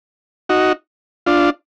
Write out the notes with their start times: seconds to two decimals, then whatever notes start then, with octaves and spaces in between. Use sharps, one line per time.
0.49 D#4 F#4
1.26 D4 F4